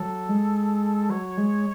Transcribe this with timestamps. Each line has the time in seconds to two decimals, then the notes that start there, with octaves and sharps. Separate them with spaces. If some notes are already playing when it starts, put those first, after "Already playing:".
Already playing: F#3 A4
0.29 G#3
1.10 F#3 C#5
1.37 G#3